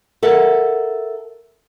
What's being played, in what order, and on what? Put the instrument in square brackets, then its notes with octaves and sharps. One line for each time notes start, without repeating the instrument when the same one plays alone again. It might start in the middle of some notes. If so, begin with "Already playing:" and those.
[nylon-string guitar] A4 A#4 E5 F#5